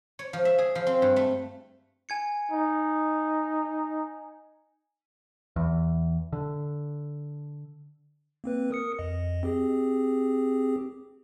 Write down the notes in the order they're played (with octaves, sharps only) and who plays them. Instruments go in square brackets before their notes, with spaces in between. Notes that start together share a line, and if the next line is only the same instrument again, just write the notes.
[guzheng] C#5
F3
E5
G#4
F3
C4
G2
A3
[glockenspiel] G#5 G#6 C#7
[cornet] D#4
[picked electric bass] E2
D3
[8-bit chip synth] A#3 C4 B4
A#4 D#6 C#7
F2 D#5
C4 G4 G#4